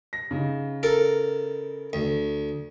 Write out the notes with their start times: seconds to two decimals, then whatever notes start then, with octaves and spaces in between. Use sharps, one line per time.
0.13 A#6
0.31 C#3 D#4
0.83 A4 A#4
1.93 D2